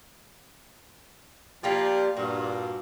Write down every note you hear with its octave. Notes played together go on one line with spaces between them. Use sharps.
F3 G3 A#3 F4 G4 D5
G2 A#2 F#4